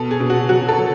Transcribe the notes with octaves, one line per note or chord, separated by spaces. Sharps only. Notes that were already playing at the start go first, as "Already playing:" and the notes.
Already playing: B2 A4
G#4
B2
F#4
F#3 F#4
A4
F#3